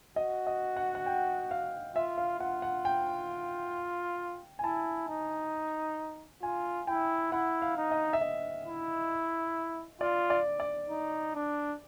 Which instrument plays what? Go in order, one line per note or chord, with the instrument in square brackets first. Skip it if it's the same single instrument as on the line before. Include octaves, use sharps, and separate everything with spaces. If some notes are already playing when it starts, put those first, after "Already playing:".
[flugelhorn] F#4 [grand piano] D#5
[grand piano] D#5
F#5
F#5
G5
F5
[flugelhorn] F4 [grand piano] E5
[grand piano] F5
[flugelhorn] F4 [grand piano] F#5
[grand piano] F#5
G5
G#5
[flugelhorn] E4 [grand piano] A5
[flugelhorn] D#4
[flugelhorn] F4 [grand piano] G#5
[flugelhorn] E4 [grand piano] G5
[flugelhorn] E4 [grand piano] F#5
[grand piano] F5
[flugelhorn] D#4
[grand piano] D#5
E5
D#5
[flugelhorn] E4
[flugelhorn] F4 [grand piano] D5
[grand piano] D5
D5
[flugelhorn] D#4
D4